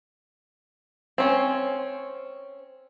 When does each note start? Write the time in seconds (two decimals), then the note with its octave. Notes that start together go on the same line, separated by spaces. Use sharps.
1.18 C4 C#4